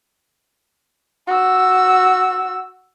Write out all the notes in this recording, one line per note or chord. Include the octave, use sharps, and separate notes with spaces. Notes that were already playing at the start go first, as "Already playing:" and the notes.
F#4 E6